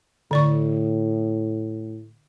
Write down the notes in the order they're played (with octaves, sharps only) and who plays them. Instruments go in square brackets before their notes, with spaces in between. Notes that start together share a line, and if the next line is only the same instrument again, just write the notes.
[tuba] A2 [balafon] D3 D5 C#6